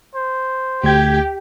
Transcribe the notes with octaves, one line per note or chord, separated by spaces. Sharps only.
C5
D2 G4 G#6